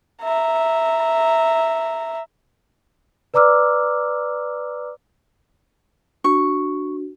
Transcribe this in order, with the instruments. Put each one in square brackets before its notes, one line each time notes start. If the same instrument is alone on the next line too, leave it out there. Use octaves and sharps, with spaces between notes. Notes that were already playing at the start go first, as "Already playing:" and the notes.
[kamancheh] E5 A#5
[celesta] B4 D5 A#5 D6 E6 F6
[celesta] D4 F#4 [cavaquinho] C#6